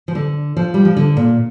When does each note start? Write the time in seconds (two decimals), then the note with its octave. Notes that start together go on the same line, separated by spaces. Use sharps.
0.08 F3
0.15 D3
0.57 F3
0.74 G3
0.85 F3
0.97 D3
1.17 A#2